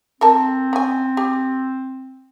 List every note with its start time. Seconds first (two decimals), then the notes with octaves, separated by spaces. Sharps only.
0.21 C4 A4 A#4 A5
0.73 C#4 G#5
1.17 G4